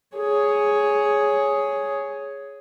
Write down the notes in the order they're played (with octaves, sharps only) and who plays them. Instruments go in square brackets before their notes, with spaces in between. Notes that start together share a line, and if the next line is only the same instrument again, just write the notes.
[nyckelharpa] G#4 C#5